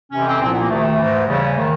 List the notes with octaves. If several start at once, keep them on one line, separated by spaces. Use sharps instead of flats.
F2 C3 E3 C#4
C4
C2 A#2 F3 C4
B3
A#3
D2 C3 D#3 A3
G#2 E3
D#2 C#3 E3 G3
D#3 A3